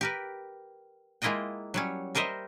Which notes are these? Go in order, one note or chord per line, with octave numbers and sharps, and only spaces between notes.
G4 A#4 B4
G#3 A#3 E4 F4 D#5 G5
F#3 G3 C#4
G3 A#4 C5 D#5 E5